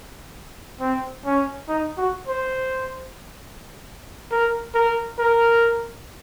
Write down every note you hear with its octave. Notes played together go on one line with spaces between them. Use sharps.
C4
C#4
D#4
F#4
C5
A#4
A#4
A#4